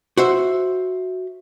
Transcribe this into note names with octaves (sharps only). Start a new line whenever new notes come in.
F#4 C5 E5